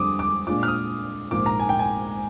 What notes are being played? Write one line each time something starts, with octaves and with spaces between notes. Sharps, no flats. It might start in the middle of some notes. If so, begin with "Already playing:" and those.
Already playing: F2 D3 G3 D6 D#6
D6
A#2 G#3 D4 F4 D6
F6
D#6
A#1 G#2 F3 A#3 D6
A#5
G#5
G5
G#5